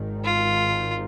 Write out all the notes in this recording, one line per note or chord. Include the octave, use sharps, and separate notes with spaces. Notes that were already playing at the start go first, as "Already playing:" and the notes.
Already playing: G#1 G#2 D#3
F4